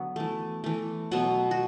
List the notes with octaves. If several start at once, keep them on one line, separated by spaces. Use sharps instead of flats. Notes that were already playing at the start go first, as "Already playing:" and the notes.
Already playing: D3 F#3 B3 F#5
E3 A3
E3 A3
B2 F#3 B3 F#5
F#4